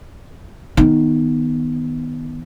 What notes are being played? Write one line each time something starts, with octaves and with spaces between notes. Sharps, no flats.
D#3 B3